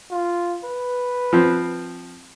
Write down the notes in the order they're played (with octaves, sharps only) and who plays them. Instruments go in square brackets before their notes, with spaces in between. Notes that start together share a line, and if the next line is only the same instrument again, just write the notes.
[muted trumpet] F4
B4
[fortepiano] F3 C4